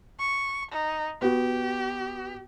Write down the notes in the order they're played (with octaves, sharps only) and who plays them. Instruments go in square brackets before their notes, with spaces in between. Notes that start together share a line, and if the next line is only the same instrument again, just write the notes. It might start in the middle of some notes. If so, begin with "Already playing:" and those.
[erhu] C#6
D#4
[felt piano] B3 F#4 [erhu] G4